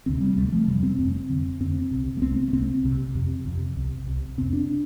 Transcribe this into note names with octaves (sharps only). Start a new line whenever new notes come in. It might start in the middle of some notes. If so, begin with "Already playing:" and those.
D2 C3 C4
G3
D2 C3 A3
F3
F2 C3 G3
C4
F2 C3 C4
F2 D3
F2 D3 C4
C2 C3
A3
C2 C3 C4
A3
C2 C3 C4
C2 C3
F2 C3
F2 C3
C2 C3
C2 C3
F2 C3 C4
D4